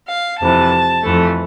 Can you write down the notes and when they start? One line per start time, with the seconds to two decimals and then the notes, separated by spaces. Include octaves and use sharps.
0.09 F5
0.40 F2 C3 E3 A5
1.03 F2 E3 A3